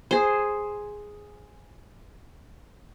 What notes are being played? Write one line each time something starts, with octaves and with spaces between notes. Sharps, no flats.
G#4 C5